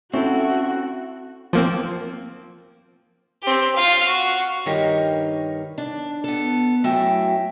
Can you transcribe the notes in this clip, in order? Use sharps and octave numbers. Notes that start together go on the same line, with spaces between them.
C4 C#4 E4 F#4 A4 E5 F#5 C#6
F3 A#3 C4
C4 G4
F4 F5
F#4
G2 D#3 D#4 G4 A#4 C#5
D4
B3 A4
F#2 F#3 A3 E4 E5 G5